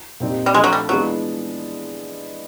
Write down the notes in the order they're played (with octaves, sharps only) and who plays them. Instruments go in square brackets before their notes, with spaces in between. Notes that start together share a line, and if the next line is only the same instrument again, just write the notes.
[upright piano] A#2 G3 C4 D#4 G4
[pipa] G3
[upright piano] F3 A3 D4 F4 [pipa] G#3
[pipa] F#3
G3
[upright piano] E3 G#3 B3 D4 F4 [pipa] F#3